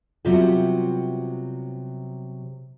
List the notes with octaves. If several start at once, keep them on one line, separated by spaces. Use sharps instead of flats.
C3 F#3 G3 B3 F4 G4